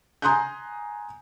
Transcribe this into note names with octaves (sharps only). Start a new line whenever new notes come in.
G#5 A#5 C6 D#6 F#6 G6